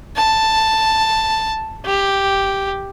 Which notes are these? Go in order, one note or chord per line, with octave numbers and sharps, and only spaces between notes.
A5
G4